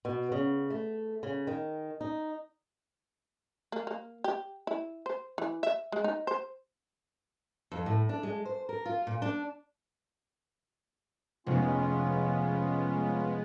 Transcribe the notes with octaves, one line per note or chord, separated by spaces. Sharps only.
B2
C#3
A3
C#3
D#3
D#4
A#3
A#3
G4
E4
C5
E3
E5
G#3
D#4
C5
F2
A2
D4
G#3
C5
A#4
F4
A#2
D4
F1 G#3 B3 C#4 F4